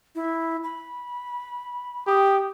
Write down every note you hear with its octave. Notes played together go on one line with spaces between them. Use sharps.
E4
B5
G4 D#6